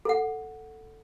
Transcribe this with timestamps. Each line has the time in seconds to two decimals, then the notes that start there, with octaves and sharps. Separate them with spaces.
0.05 A4 F#5